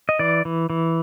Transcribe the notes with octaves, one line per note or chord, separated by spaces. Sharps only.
D#5
E3 D5
E3
E3